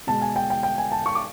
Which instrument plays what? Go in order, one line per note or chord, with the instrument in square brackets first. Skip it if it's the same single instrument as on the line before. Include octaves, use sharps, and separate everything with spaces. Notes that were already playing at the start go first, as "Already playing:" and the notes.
[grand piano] B2 G#3 A5
G#5
G5
G5
G5
G#5
A5
C#6
D6